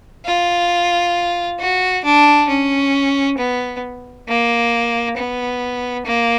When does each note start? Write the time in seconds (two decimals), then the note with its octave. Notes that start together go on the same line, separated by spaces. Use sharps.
0.25 F4
1.60 F#4
2.05 D4
2.49 C#4
3.38 B3
4.28 A#3
5.16 B3
6.06 A#3